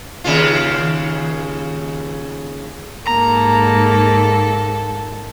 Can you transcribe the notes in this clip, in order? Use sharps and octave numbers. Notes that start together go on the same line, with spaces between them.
D#2 C#3 F4
G#2 A#3 A4 A#5